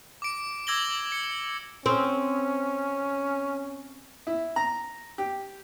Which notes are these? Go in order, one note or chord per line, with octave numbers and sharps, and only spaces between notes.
D6 D7
D6 E6 G#6 A#6 F#7 G7
C#7
C4 C#4
E4
A#5
G4